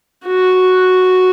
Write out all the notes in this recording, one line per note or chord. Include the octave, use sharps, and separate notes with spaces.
F#4